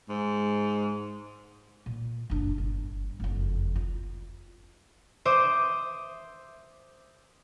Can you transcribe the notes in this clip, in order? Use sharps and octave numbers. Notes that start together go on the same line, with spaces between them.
G#2
A#2
F#1 D4
G1
F#1 F2
F4
C5 E5 D6 D#6 G6